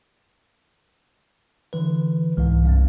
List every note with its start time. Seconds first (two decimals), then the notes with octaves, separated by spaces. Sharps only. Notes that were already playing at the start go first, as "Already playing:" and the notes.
1.73 D3 E3 B4
2.37 C2 G#2 E3 G#3
2.65 G2 G#3 C4